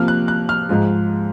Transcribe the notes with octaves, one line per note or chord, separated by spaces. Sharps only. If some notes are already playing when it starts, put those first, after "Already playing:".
Already playing: C3 F3 A#3 F6
F#6
F#6
F6
G#2 F3 G#3